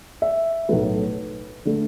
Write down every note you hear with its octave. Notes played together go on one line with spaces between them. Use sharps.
E5
B1 A2 F#3 A3 B4
D3 A3